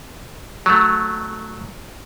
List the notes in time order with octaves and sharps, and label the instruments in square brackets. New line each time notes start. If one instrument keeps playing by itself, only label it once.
[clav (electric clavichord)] F#3 A3